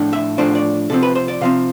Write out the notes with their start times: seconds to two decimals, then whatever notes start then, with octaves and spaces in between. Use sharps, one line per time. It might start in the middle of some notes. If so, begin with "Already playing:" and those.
Already playing: A2 F3 A3 D4
0.13 E5
0.38 A2 F3 A3 D4 C5
0.55 D5
0.90 C3 F3 C4 A4
1.03 B4
1.15 C5
1.28 D5
1.41 C3 F3 C4 F5